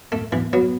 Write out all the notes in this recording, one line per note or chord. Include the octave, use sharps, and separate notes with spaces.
F#2 A3
E3 B3
F#3 B3